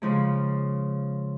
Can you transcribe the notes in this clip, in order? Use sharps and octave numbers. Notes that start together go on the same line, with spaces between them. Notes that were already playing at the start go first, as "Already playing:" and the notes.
C#3 F3 G#3